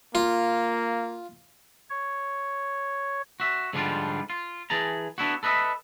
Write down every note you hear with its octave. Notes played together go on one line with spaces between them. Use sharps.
A#3 F4
C#5
F#4 E5
G#2 D3 F3 G3 D4 F4
F4
E3 G#4 A5 A#5
B3 D4 E4 F#4
A4 B4 D#5 E5